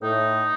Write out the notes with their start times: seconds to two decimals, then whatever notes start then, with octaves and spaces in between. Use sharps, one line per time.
0.02 A2 D#4